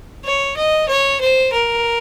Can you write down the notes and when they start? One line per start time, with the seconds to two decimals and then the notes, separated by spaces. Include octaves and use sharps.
0.25 C#5
0.57 D#5
0.88 C#5
1.20 C5
1.53 A#4